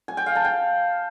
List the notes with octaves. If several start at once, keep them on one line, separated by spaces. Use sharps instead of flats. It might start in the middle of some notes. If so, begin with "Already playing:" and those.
G#5
G5
F5
A5
G5